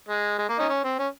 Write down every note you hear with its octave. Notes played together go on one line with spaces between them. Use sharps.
G#3
G#3
A#3
C#4 D#4
C#4
C4
C#4